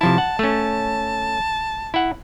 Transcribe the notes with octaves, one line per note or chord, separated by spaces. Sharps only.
C3 F3 E4 A5
F#5
A3 C#4
E4 F#5